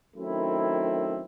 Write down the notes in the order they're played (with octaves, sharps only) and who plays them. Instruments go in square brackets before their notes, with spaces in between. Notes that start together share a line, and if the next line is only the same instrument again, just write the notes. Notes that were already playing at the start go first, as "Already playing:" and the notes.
[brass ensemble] F#2 D#3 A3 C4 E4